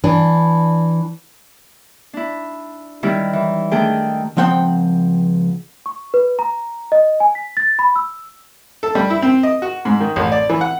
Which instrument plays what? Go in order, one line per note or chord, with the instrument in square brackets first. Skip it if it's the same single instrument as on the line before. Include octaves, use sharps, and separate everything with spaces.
[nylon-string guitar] E3 D4
[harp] D4 E4
D#3 G3 C#4 E4
E3
D#3 A3 D4 G#4 G5
[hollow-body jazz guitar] C#2 F3 C4 F#5 G5
[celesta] C#6
B4
A#5
D#5
G#5
B6
A6
B5
E6
[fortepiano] A4
G3
E4
C4
D#5
F#4
G#2
D#3
A1
D5
E3
F#5